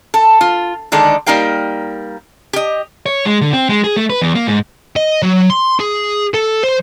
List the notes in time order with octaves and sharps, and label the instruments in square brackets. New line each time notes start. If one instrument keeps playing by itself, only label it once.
[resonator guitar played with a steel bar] A4
F4
D3 D#3 G#3 D4 A4
G3 A#3 D#4 A#4 F5 G5
G4 D#5
[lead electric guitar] C#5
G#3
D3
C4
G#3
G#4
A3
B4
E2
A#3
G#2
[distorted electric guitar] D#5
F#3
C6
G#4
A4
C5